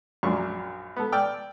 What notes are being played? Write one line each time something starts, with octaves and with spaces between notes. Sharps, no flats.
A#1 F#2 D4 C#6
B3 A4
D5 G5 E6 F6